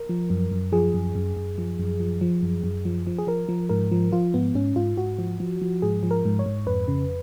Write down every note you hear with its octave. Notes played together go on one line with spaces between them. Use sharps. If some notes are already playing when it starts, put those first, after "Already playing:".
Already playing: A#4
F3
F#2
F#2
F3 G#4
F#2
F#2
F#2
F3
F#2
F3
F3
F#2
F#2
F3
F3
G#4
F3 A#4
F3
G#2 A#4
F3
F3 F4
G#2 B3
G#2 C#4
G#2 F4
G#2 F#4
F3
F3
F3
G#2 G#4
F3
A#4
G#2
C#5
G#2
F2 B4
C#3